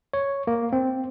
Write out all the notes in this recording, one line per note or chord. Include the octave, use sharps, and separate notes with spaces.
C#5
A#3
C4